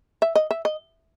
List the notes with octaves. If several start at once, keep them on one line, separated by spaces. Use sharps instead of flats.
E5
D#5
E5
D#5